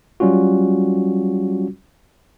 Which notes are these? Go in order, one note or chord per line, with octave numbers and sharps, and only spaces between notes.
F#3 G3 C#4 F4 F#4